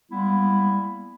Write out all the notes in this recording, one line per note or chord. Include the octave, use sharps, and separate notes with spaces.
G3 G#3 A#3 B3 E4